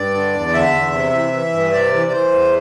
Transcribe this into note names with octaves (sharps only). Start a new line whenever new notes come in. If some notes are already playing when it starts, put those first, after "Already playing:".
Already playing: G2 D5
D3
E2
D3 E5
E2
C3
E3
E3
G2
C3 D5
E3
D5
E3 C5
E2